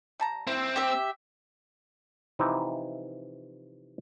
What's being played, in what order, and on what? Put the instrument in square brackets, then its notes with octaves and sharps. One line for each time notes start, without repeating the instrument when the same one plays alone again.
[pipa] G3 A5 A#5
[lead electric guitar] C4 [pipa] E4 G5
[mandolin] G4 E5
[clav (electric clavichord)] C3 E3 F3 D#4 E4